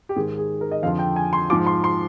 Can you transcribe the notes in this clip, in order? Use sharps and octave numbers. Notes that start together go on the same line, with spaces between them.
G4
G#2 D#3 G#4
G#4
A#4
D#5
F2 D3 F3 F5
G5
G#5
C6
G#2 F3 D6
C6
C6